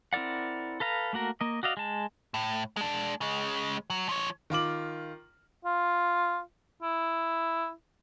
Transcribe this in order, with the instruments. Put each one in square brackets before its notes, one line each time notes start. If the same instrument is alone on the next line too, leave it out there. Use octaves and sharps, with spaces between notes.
[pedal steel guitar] C4 E4 A#4 D5 F#5
A4 B4 F5 A#5
A3 A#3 F#4 A#4
A#3 D#5
F#4 D5 D#5 F5
G#3 A5
[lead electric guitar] A2
G#3 D4
C#3 G#3
F#3
F3 C#5
[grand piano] D#3 F4 D6 F#7
[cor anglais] F4
E4